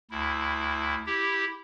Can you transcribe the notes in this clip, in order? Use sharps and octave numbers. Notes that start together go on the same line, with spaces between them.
D2 E4
E4 G4